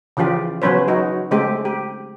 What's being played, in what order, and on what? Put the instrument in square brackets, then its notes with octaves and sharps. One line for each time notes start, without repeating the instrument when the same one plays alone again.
[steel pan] C#3 E3 F3 F4 G4
C#3 F#3 B3 C#4 B4 C5
F#3 D#4 F#4
C#3 G#3 A3 C4 G4
G4